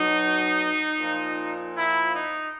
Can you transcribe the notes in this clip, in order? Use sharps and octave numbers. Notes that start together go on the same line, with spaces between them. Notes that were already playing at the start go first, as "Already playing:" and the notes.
Already playing: B2 F#3 D#4
A#2 F3
E4
D#4